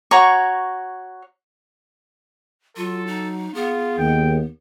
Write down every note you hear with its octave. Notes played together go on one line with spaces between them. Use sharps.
F#4 C#5 A#5 C#6
F#3 F4 A4
D#4
B3 F4 G#4
D#2 G5